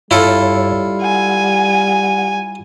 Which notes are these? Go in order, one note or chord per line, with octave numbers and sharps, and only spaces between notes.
G2 G3 E4 F4 A4 C#5
F#5 G#5